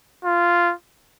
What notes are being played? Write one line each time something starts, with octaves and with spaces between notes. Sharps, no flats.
F4